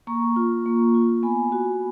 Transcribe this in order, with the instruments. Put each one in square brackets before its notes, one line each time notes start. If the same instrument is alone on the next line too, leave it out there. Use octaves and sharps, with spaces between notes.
[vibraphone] A#3 A#5 C#6
F4
A#3
F4
B3 G#5 B5
F#4